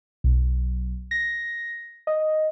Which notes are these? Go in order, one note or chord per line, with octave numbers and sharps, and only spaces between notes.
B1
A#6
D#5